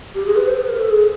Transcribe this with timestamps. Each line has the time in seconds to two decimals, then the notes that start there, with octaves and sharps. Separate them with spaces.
0.15 G4
0.26 G#4
0.36 B4
0.47 C5
0.58 B4
0.69 A#4
0.79 A4
0.90 G#4